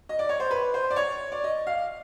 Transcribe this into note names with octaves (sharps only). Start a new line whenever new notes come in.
D#5
D5
C#5
C5
B4
C5
D5
C#5
D5
D#5
F5